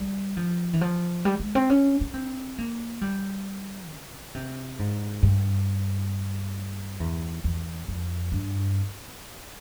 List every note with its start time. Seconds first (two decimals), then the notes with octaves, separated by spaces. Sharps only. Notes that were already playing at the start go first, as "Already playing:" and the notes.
Already playing: G3
0.37 F3
0.73 E3
0.81 F3
1.25 G3
1.40 G#3
1.55 C4
1.70 C#4
2.01 C#4
2.14 C4
2.58 A#3
3.01 G3
3.90 C#3
4.35 C3
4.79 G#2
5.23 G2
7.00 E2
7.44 E2
7.88 F2
8.32 G2